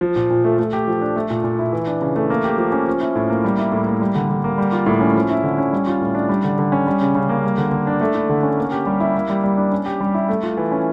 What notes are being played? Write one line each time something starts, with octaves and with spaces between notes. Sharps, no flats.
F3
A#2
A#2
A3
A3
G4
F3
D4
A3
A#2
A#2
E4
E3
D4
C#3
A3
A#3
G4
F3
C#4
F3
E4
A2
A#3
G3
E4
A2
A#3
G3
D3
D3
A#3
G3
F4
A2
C#4
F3
E4
D3
C#4
G3
F4
A2
D4
G3
D3
D3
C#4
G3
C#3
C#3
A#3
G3
D3
D3
D4
A3
E4
D3
C#4
A#3
G4
G3
E4
A#3
G3
G3
D4
C#4
G4
G3
E4
A3
F4
E3
C#4